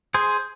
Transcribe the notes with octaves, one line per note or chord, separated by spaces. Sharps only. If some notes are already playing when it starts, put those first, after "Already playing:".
G#4 C5